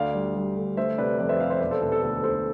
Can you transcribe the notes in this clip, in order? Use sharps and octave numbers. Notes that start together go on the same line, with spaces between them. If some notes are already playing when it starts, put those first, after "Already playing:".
Already playing: D2 D5 F5
G3
G3
D2
A3 C5 E5
C3 B4 D5
F2 B4 D5
C5 E5
C3 D5 F5
C5 E5
E1 B4 D5
A4 C5
E1 A4
A4
D2 A4
E1 A4 C5